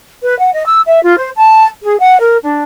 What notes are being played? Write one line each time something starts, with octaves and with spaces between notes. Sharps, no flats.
B4
F#5
D#5
E6
E5
F4
C5
A5
G#4
F#5
A#4
D4